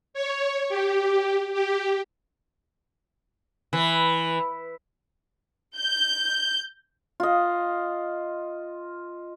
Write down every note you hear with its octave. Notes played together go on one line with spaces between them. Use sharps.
C#5
G4
G4
E3
G6
F4 D#5